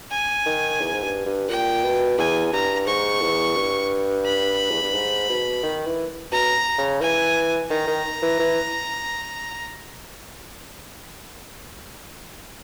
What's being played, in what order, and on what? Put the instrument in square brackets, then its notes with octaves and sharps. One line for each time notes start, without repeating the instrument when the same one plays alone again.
[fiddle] G#5
[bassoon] D#3
E2
G#2
G2
G2
[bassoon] A#2 [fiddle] G5
[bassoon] B2
[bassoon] E2 [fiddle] G#5
[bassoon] G2 [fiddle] A#5
[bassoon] G#2 [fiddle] C#6
[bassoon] E2
G2
[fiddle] B5
[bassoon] E2
G2
G#2
B2
D#3
E3
[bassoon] B2 [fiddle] A#5
[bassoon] C#3
[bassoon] E3 [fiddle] G#5
[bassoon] D#3 [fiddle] A#5
[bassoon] D#3
E3
E3